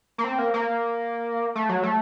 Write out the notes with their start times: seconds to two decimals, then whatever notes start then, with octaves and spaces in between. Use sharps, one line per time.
0.18 A#3
0.24 C4
0.39 A#3
0.54 A#3
1.55 A3
1.69 F#3
1.83 A3